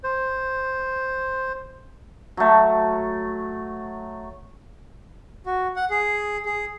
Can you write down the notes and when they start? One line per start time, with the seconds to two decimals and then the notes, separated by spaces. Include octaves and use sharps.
0.04 C5
2.37 F#3 A3
5.46 F#4
5.76 F#5
5.90 G#4
6.45 G#4